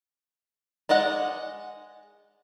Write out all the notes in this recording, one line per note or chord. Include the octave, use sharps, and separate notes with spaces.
G#3 D5 D#5 F#5